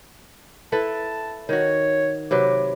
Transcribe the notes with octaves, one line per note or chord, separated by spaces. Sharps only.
E4 A4 B4 A5
D#3 F#4 C#5
C3 F#3 B4 D6